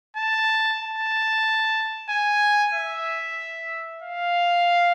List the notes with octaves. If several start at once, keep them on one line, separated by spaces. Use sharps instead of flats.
A5
A5
G#5
E5
F5